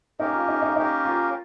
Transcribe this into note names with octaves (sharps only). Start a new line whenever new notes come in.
A#3 C#4 D#4 G4 A#4
F4
D#4
D#4
A#3 C#4 D#4 G4 A#4
F4